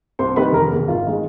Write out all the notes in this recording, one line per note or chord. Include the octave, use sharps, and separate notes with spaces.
C2 C5 C6
C3 D#3 G3 B4 B5
F1 A#4 A#5
E2 B2
G#1 F4 F5
D#3 G#3